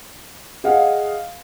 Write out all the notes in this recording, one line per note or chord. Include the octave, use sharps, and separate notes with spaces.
G#4 D#5 F5 F#5